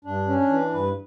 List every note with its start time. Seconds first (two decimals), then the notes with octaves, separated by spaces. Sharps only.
0.05 G2 D4
0.27 C#4
0.38 D4
0.49 E3
0.71 G2 B4